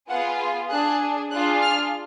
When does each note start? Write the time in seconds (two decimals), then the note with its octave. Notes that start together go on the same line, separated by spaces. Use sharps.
0.08 B3 F4 G#4 F#5
0.40 G#5
0.70 D4 G#4 F#6
1.31 D4 F4 G#4 F#6
1.63 F6